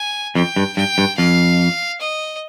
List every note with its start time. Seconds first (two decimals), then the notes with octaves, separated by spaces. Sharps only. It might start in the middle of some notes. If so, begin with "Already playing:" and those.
Already playing: G#5
0.35 F2 G5
0.56 G2
0.77 G2 G5
0.98 G2
1.18 F2 F5
2.00 D#5